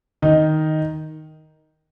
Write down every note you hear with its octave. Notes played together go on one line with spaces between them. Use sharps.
D#3 D#4